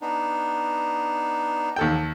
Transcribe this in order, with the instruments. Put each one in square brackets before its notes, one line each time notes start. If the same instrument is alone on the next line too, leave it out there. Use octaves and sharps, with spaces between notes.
[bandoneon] B3 D4 D#4
[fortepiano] D#2 A4 G5